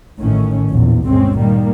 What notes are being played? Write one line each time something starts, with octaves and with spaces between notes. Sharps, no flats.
A1 A2 D#3 C#4
A#1 E2
G1 D2 B2 G#3 C4 C#4
A#2 D#3 G3 A#3